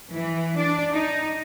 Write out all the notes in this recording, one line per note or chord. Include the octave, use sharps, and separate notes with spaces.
E3
D4
D#4